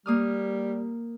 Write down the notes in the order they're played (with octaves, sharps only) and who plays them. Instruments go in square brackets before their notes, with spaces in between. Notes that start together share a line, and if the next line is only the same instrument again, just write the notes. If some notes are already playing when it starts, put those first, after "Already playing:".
[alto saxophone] G3 [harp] A#3 D#6 F6